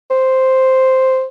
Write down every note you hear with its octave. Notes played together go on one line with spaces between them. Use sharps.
C5